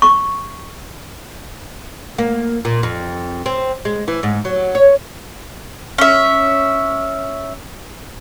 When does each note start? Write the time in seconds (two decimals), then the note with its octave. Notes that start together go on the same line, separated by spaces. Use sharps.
0.02 C#6
2.18 A#3
2.65 A#2
2.83 F2
3.46 C4
3.85 G#3
4.08 E3
4.23 G#2
4.45 F#3
4.75 C#5
5.98 C#4 E5